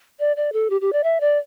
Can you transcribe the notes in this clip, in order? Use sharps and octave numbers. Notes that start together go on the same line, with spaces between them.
D5
D5
A4
G4
G4
D5
E5
D5